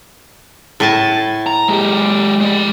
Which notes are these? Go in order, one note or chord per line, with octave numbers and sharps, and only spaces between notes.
A2 G#5 A5
A#5
G#3 G4
G#3 D5